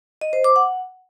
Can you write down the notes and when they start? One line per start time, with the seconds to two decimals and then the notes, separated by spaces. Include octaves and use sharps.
0.21 D#5
0.33 C5
0.44 D6
0.56 F#5